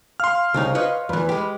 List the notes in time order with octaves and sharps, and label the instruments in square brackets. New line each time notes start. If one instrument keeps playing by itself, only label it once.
[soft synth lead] F5 [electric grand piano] C6 F6
[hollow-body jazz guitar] C2 C#3 D#4
B4 C#5 D#5
[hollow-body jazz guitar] E2 E3 [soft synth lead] B4
[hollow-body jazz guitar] G#3 G4